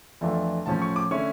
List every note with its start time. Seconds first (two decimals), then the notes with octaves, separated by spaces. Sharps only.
0.21 F2 E3 A3 D4 F4
0.66 A2 F3 C#4 A5
0.82 C#6
0.96 D6
1.11 D3 A3 C#4 E4 C#6